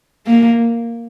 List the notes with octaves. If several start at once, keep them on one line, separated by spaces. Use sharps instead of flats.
A#3